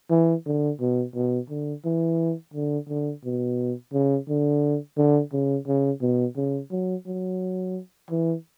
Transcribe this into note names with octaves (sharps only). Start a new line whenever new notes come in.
E3
D3
B2
B2
D3
E3
D3
D3
B2
C#3
D3
D3
C#3
C#3
B2
C#3
F#3
F#3
E3